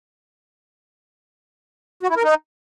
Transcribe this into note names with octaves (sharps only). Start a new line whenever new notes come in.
F#4
E4
A#4
D#4